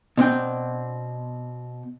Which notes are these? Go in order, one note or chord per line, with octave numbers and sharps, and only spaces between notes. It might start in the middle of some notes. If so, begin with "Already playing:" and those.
B2 C4 D4 G5